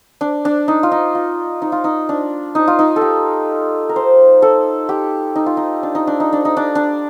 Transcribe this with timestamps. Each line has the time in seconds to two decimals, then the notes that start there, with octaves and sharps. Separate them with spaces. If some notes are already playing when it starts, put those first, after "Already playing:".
0.21 D4
0.45 D4
0.68 D#4
0.83 F4
0.91 D#4
1.15 F4
1.62 D#4
1.72 F4
1.84 D#4
2.09 D4
2.55 D#4
2.68 F4
2.79 D#4
2.96 A4
3.01 G4
3.89 A#4
3.96 C5
4.42 A4
4.89 G4
5.35 D#4
5.46 F4
5.57 D#4
5.83 D4
5.95 D#4
6.07 D4
6.20 D#4
6.33 D4
6.45 D#4
6.57 D4
6.75 D4